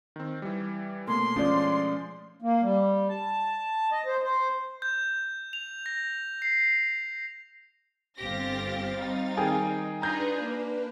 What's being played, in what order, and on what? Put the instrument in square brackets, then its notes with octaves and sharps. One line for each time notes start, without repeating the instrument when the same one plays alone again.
[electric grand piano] D#3 C4
E3 G3
[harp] B2 A3 C#4 [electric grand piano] A#3 [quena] C6
[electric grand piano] F3 G#3 F4 [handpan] C#4 D5 [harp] C#6 G6
[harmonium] A#3
G3
A5
D#5
C5
C5
[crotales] G6
F7
A#6
C7
[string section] G1 G4 A#6 [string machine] C4 F5 A6
[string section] G3 D#4
[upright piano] D#3 G#4 G5
[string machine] D4 B4 [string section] D#4 F4 G#4 [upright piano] A#5 G6 A#6
[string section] A#3